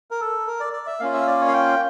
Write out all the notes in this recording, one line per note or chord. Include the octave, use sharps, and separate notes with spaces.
A#4
A4
A#4
D5
D5
E5
A#3 C#4 F4 F5
E5
D5
C#5
F5
G5